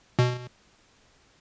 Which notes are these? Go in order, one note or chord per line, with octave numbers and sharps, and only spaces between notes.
B2